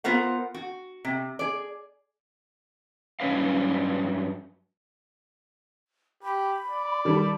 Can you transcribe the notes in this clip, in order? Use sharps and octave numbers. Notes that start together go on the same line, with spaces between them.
B3 F4 A#4 C5 F#5
F#4
C3
G#4 D5
G2 F#3 G3 C#4 B4 F5
G4 B5
D5
D#3 G3 A4